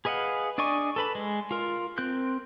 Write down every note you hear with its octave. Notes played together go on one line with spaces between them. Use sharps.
G#4 B4 D#5 F5 F#5
D4 D5 D#5 G#5 C#6
A4 B4 B5
G#3
F4 A#4
C4 A#4 F#6 G6